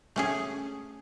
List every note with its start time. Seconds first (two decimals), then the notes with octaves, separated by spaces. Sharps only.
0.16 A3 C#4 G#4